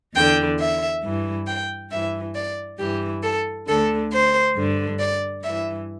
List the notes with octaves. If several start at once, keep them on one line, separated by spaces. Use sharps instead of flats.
E2 D3 G5
E5
G2 E3
G5
G2 E3 E5
D5
G2 E3 G4
A4
D2 D3 A4
C5
G2 D3
D5
G2 E3 E5